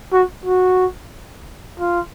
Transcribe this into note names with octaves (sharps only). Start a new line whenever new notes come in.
F#4
F#4
F4